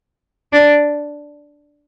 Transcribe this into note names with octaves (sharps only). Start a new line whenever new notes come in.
D4